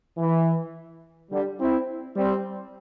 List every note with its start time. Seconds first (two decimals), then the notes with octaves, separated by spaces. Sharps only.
0.17 E3
1.31 D3 G3
1.59 C4 E4
2.16 G3 C4